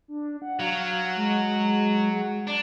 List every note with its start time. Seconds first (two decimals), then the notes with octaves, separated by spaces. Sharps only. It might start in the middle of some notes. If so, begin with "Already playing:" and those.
0.08 D4
0.42 F#5
0.60 F#3 F5
1.16 G#3
2.47 D4 A5